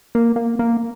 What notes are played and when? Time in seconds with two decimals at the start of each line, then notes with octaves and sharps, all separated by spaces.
0.15 A#3
0.36 A#3
0.59 A#3